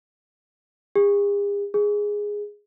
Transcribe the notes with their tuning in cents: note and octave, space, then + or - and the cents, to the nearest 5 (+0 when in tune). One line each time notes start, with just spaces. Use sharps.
G#4 -45
G#4 -5